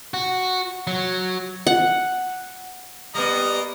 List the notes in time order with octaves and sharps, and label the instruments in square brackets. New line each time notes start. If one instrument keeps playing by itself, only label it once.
[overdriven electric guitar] F#4
F#3
[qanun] F#5
[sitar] G3 B3 [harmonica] A#3 D#5 A#5